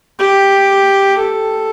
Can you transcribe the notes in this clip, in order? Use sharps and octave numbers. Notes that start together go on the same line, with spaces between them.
G4
A4